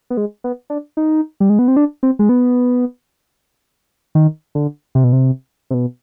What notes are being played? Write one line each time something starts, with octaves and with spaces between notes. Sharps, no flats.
B3
G#3
B3
D4
D#4
G3
G#3
B3
C4
D4
C4
G#3
B3
D#3
D3
C3
B2
C3
C3
B2